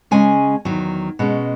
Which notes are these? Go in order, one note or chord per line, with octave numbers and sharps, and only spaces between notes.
C#3 G#3 C#4 G#5
E2 D#3 F#3
B2 G#3 C#4